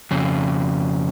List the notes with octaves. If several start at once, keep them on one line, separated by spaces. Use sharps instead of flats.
F2 C#3